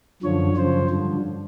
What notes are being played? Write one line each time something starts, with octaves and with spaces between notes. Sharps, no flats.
F#2 D3 F3 C#5
F#2 C#3 F3 C5
G2 D3 F3